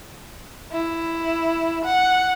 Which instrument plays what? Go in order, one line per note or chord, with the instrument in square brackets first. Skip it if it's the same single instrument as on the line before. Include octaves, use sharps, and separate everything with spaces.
[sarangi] E4
F#5